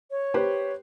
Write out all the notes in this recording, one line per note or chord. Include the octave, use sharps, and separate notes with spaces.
C#5
G4 B4 C5